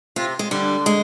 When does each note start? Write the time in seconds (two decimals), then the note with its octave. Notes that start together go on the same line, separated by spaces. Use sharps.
0.16 C3 F4
0.39 G#3
0.51 D3 G3
0.86 G#3